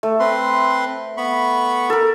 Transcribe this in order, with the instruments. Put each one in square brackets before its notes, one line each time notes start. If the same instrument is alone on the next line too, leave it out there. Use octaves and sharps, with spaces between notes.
[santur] A3
[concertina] C4 B4 C6
B3 B5 C#6
[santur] A4 A#4